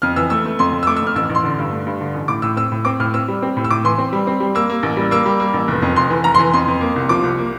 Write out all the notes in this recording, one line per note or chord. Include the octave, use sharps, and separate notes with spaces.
F2 F6
E3 E6
A3 E6
A3
F2 C6
F2
E6
A3 D6
E6
F2 F6
A1 E6
A1
C6
D3
G2
A3
G2
D3
A1
A2 D6
A2 E6
C4 E6
A2
C4 D6
A2 F6
C4 E6
G3
C4
A2
E6
A2 D6
E3 C6
C4
G3
C4
G3
A#3 E6
A#3
A1
G3
A#3 E6
G3
A#3
A1
F1
F2
F1 C6
E3
F1 A#5
C6
E3
F2 C6
F2
A#3
C2
F3 D6
C2
A#3